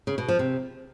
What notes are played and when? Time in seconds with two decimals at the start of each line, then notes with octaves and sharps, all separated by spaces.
0.07 C#3
0.18 B2
0.28 F3
0.39 C3